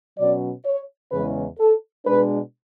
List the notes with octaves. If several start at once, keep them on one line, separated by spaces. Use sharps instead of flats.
B2 F#3 C#4 D5
C#5
E2 C#3 E3 G#3 B4
A4
B2 G#3 D4 B4